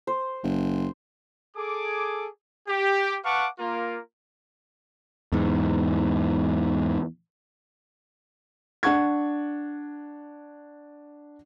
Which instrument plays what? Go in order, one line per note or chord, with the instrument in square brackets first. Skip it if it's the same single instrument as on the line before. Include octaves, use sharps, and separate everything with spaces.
[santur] C5
[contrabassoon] F#1
[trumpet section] G#4 A4 D6
G4
B4 F5 F#5 A5 C#6 D6
A#3 F4 A#4
[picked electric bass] E2 G#2
[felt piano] D4 F#5 C#6 G#6